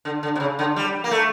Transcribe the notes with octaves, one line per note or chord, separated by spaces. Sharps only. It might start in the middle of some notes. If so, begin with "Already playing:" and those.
D3
D3
C3
C#3
D3
G3
A#3
A3